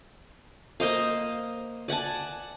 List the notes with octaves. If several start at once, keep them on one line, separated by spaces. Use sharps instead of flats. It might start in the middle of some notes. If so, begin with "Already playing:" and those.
A#3 C5 D#5 F5
D5 F#5 G#5 A5